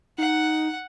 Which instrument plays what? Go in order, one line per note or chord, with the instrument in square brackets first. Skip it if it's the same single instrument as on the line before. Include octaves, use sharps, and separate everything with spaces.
[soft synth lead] D#4 [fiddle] F#5